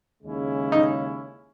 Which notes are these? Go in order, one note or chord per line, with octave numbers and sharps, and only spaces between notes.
D#2 C#3 G#3 C#4 E4
D#4